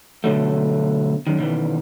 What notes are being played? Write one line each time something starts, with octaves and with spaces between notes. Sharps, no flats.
B2 D3 F#3 A3
F#2 D#3
B2 D#3 E3